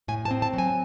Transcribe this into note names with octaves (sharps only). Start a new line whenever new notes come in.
A2 G#5
A5
C4
A5
F#3
G#5